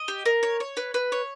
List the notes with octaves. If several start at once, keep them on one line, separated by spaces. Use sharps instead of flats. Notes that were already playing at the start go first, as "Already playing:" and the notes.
Already playing: D#5
G4
A#4
C#5
C#5
B4
B4
C#5